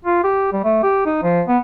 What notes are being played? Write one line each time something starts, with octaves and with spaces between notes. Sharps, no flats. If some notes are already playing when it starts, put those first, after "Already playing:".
F4
G4
G3
A3
G4
D#4
F3
B3